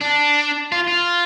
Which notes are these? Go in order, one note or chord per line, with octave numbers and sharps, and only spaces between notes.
D4
F4
F4